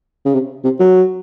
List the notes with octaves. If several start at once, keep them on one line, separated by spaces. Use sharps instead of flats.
C#3
C3
C3
F#3